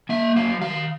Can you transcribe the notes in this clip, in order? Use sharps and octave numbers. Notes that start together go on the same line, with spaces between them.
A#3 E5
F#3 F5
D#3 F5